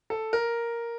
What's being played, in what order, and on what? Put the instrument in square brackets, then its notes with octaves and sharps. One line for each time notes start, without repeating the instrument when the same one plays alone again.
[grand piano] A4
A#4